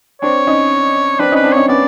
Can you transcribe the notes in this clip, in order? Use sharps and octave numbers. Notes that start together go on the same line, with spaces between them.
C4 D4 C#5
C#4 D#4
C4 D4 B4
C#4 D#4 B4
C4 D4
C#4 D#4 C#5
B3 C#4 D5